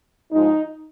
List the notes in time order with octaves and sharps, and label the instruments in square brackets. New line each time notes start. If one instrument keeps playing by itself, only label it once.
[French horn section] G#2 F3 G#3 D#4